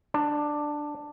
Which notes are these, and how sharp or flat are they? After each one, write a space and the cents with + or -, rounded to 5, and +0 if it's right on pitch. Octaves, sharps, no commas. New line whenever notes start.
D4 +10